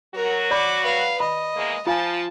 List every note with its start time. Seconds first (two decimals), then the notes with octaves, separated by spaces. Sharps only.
0.15 F#3 F#4 A#4
0.51 D5 B5 D6
0.82 B4 F5
1.20 D#5 B5
1.56 E2 G#3 A#3
1.87 F3 F4 F5 G#5 A5